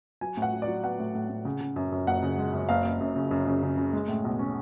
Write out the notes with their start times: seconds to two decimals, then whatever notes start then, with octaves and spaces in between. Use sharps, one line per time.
0.21 F#3 G#5
0.37 A2
0.42 F#5
0.53 F#3
0.62 D5
0.67 F#3
0.83 B3 F#5
0.99 A2
1.15 A2
1.30 A2
1.45 C#3
1.60 C#3
1.76 F#2
1.92 F#2
2.07 F#1 F#5
2.22 C#3
2.38 G#3
2.53 F#2
2.69 F#1 F5
2.84 F#1
3.01 F#2
3.16 C#3
3.31 F#2
3.47 C#3
3.63 C#3
3.77 C#3
3.93 G#3
4.08 A2
4.25 B1
4.39 C#4